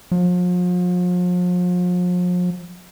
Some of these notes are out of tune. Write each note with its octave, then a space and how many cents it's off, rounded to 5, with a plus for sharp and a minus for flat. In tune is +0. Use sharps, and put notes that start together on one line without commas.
F3 +40